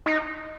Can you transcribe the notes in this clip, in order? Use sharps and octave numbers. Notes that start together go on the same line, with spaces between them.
D#4